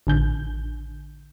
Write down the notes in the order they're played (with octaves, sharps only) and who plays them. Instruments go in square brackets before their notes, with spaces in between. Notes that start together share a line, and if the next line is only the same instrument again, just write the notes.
[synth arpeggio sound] A1 D3 G6